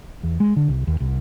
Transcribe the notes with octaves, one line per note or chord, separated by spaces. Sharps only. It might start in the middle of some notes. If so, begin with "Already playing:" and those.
E2
G#3
D3
C2
D#2
C2